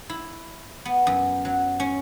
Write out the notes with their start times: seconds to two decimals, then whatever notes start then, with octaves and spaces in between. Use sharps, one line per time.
0.10 E4
0.85 B3
1.07 F#2
1.45 F#3
1.80 C#4